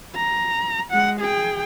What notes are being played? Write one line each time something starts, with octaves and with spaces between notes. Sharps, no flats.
A#5
G#3 F#5
G#4 G5